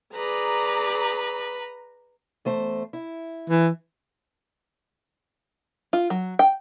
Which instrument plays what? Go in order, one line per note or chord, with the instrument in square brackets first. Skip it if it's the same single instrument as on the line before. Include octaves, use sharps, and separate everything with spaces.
[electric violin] G#4 D5 [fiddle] B4 [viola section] A#5
[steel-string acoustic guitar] E2 A3 C5
E4
[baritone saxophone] E3
[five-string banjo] F4
F#3
G5